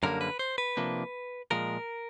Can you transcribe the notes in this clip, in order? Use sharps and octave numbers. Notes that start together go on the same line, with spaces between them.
F#2 D3 G3 A#3 A#4
B4
C5
B4
C3 F3 A#3 D4
A#2 F3 G#3 A#4